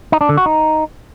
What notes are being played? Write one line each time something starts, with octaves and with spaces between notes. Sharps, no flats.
D#4
D4
D3
F#4
D#4